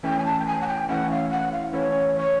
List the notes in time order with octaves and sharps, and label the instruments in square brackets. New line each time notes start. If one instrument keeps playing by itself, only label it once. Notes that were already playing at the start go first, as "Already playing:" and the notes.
[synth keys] E3 A3 C#4 E4 [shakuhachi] G5
[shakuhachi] G#5
A5
G5
G#5
F#5
G5
[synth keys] E3 A3 C#4 E4 [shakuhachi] F#5
[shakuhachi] F5
F#5
F5
[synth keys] E3 A3 C#4 E4 [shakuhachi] C#5
[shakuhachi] C#5